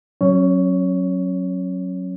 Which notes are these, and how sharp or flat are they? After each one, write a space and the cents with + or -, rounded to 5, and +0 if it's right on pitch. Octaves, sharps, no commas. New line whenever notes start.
F#3 +0 C#4 -25 C#5 +15